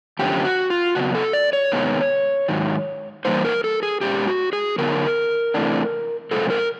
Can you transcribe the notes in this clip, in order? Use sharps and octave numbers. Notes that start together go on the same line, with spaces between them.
F#2 D3 F3 A3 C#4 G4
F#4
F4
C#3 F#3 B3 F#4
A4
D5
C#5
C3 D#3 G#3 B3
G#2 D#3 F#3
E3 G3 A#3 D#4 C5
A#4
A4
G#4
B2 G#3 C#4 G4
F#4
G#4
D3 F#3 B3 D#4 A#4
C3 E3 A3 D4
C3 F3 G#3 C4 A4
A#4